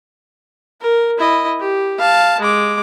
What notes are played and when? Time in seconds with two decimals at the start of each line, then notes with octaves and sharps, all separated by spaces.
0.81 A#4
1.18 E4 D#5
1.60 G4
1.99 F5 A5
2.40 G#3 D6